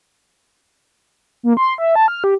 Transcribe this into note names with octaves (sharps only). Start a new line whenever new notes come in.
A#3
C6
E5
A5
F6
G4